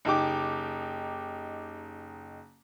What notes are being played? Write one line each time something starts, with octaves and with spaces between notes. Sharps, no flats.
F#1 D#4 G4 D6